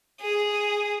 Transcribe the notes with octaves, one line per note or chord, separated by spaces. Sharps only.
G#4